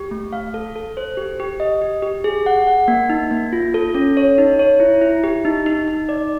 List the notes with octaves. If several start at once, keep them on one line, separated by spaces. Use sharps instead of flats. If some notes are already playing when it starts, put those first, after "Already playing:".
Already playing: G4
A3
F5
A4
A4
C5
G4
G4
D#5
G4
G4
G#4
F#5
F#5
A#3
D#4
A#3
F4
A4
C#4
C#5
D#4
C#5
E4
E4
G4
D#4
D#4
D#4
D5